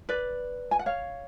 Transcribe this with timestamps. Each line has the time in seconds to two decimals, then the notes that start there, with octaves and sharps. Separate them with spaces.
0.09 B4 D5
0.71 G#5
0.79 F#5
0.86 C#5 F5